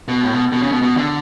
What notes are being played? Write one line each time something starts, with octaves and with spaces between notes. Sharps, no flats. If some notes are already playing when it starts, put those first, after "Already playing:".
B2
A2
B2
B2
C#3
B2
B2
D3